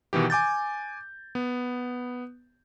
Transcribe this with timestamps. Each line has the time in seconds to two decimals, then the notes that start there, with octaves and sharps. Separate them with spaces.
0.13 B2 D#3 E3 G4
0.30 G#5 D6 G6 A6
1.35 B3